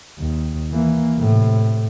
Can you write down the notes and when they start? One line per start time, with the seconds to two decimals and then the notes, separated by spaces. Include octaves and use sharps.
0.19 D#2
0.72 E3 A#3
1.17 A2 C3